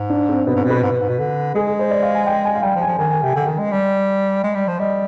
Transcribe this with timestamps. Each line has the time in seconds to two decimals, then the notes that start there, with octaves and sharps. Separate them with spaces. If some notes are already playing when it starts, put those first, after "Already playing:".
Already playing: G#2
0.10 D4
0.29 C4
0.47 B2 B3
0.56 G#2 C4
0.65 B2
0.70 B4
0.83 G#2
0.91 B2
1.01 G#2
1.09 B2
1.19 D3
1.55 G#3 G#4
1.67 G#4
1.79 C5
1.91 D5
2.03 F5
2.15 G#5
2.26 G5
2.45 G#5
2.55 F5
2.63 G3 G5
2.75 F3
2.82 G#5
2.88 F3
2.99 D#3 G#5
3.11 G#5
3.23 C3 G5
3.29 G#5
3.35 D3 G5
3.47 D#3
3.59 G#3
3.72 G3
4.44 G#3
4.55 G3
4.68 F3
4.79 G3 D#5